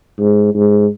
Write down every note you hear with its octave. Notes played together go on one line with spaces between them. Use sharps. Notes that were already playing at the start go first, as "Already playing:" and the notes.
G#2
G#2